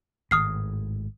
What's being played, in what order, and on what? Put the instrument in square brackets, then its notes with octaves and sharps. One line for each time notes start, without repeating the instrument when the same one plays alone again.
[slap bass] G#1 A2 [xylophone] D#6 F6 C7